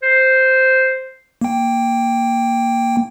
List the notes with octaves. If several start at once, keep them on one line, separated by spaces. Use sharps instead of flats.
C5
A#3 G5